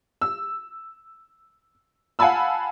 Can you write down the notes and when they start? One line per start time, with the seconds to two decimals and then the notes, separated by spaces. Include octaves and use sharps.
0.22 E6
2.19 F5 F#5 G#5 A5 B5 E6